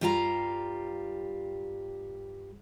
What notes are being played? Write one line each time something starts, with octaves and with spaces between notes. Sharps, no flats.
G2 G3 F4 F5 A5 A#5